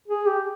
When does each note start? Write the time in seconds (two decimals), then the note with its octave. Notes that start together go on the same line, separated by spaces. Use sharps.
0.08 G#4
0.26 G4